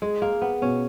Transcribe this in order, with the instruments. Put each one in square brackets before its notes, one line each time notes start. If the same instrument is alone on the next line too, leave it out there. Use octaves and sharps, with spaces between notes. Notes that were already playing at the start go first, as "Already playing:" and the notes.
[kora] G#3 [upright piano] G#4
[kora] A#3 [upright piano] G#4
[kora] B3 [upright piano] G#4
[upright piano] B2 [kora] C#4